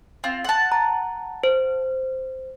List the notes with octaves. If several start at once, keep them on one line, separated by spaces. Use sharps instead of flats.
C4 F4
F#5 A5
A#5
C5